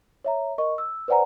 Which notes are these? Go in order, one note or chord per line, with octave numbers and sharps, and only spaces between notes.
C#5 E5 A#5
A#4 D#5 C#6
E6
B4 C5 D5 F#5 G#5 A#5